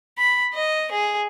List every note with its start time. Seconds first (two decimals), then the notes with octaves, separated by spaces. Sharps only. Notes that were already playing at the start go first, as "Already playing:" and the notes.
0.18 B5
0.54 D#5
0.91 G#4